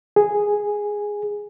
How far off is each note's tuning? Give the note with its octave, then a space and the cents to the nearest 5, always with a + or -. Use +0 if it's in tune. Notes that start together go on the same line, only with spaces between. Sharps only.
G#4 -5